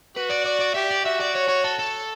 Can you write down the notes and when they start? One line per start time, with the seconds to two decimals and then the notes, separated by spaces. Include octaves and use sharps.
0.17 F#4 B4
0.30 D5
0.46 D5
0.61 D5
0.75 G4 E5
0.91 D5
1.05 F#4 E5
1.20 D5
1.35 C#5
1.49 C#5
1.64 A4
1.79 A4